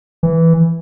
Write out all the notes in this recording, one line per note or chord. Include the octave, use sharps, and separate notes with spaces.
E3